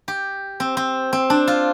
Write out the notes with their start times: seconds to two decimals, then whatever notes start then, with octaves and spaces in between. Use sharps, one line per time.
0.08 G4
0.60 C4
0.77 C4
1.13 C4
1.30 D4
1.47 F4